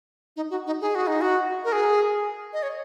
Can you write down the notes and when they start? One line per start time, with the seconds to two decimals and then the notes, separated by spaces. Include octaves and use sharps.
0.36 D#4
0.50 F#4
0.67 D#4
0.81 G#4
0.95 F#4
1.07 D#4
1.21 F#4
1.64 A#4
1.72 G#4
2.53 D#5
2.63 C#5